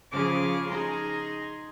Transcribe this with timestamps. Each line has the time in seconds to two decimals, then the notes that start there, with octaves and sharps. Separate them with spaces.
0.11 C#3 F3 C#4 G#4 D6 F6
0.69 D#4 G#4 A#5 C6